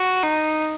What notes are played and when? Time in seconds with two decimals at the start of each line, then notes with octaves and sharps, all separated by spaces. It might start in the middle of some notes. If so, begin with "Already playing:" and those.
Already playing: F#4
0.24 D#4